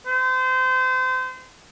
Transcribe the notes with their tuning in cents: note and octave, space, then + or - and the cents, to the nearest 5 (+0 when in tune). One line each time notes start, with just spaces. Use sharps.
C5 -30